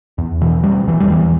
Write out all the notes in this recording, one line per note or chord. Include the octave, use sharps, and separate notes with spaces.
E2
B2 E3
B2 G3
E2 E3
G3
E2 E3